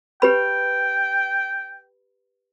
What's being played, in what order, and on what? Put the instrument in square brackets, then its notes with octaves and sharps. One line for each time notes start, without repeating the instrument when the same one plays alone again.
[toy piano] G4 B4 B5 [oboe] G5